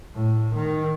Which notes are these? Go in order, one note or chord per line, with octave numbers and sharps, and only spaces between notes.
A2
D#3